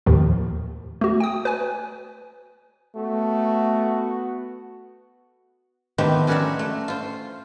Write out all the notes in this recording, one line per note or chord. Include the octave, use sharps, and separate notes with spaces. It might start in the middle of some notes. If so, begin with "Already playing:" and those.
D#2 A2 D#3 F3
A3 F#4
G5 D#6
B4 G#5
A3 B3 F#4
D#3 F3 A3 B3 C4 G4
G3 C#4 F#4 A#4 D5 E5
A3
F4 C5